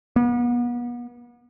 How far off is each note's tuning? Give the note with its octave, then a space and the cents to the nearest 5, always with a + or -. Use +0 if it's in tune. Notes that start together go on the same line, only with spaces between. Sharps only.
B3 -35